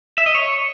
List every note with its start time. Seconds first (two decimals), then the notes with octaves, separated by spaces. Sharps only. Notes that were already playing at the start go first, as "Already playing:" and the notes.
0.18 E5
0.26 D#5
0.35 C#5